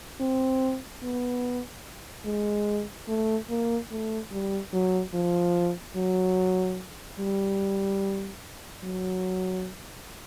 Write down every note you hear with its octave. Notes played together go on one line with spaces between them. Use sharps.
C4
B3
G#3
A3
A#3
A3
G3
F#3
F3
F#3
G3
F#3